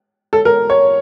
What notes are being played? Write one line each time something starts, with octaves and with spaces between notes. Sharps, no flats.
A4
A#4
C#5